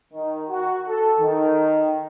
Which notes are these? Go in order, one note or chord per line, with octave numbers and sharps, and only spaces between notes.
D#3
F#4
A4
D#3